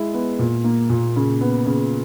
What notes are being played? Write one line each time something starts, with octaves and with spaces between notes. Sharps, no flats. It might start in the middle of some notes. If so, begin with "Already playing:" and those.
Already playing: G#3 E4
B3
A#2
A#3
A#2
C#3
B3
C#3